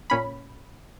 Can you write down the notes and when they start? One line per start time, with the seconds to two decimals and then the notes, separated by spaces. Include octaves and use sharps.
0.10 A#2 C#4 B5